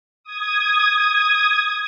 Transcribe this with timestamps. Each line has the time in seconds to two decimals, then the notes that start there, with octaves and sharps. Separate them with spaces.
0.24 D#6 G#6